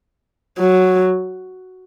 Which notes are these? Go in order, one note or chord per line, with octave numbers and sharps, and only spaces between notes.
F#3